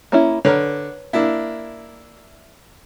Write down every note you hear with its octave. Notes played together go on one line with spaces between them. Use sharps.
A#3 C#4 E4
D3 A#4 B4 C#5
A#3 D4 E4